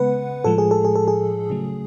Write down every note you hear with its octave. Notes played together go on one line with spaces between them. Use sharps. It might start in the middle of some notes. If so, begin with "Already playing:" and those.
Already playing: C#3 G#3 B3 B4 F#5
A2 F3 G#3 A4
G#4
A4
G#4
A4
G#4
C#3 F#3 A3